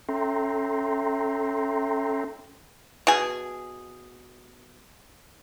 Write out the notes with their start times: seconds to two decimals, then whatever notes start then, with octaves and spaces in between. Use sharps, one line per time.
0.09 C#4 A4 E5 G5 A#5 C6
3.07 B2 G#4